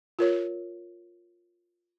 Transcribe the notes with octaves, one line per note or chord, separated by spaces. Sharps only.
F4 A#4 C#5